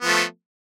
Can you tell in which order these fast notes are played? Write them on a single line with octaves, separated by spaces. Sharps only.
B3 F3 A3